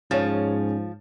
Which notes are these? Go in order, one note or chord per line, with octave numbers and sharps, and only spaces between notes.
G#2 F3 C#4 G#4 C#5 A6